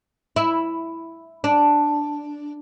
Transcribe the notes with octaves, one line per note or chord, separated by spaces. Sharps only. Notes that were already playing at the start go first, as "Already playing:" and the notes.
E4
D4